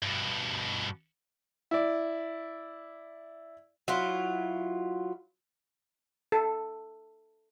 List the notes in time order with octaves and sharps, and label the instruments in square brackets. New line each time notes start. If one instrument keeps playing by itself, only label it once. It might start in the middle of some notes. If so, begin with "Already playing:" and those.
[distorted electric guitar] G2 B2
[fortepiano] E4 D5
[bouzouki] F#3 E4 F4
[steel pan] A4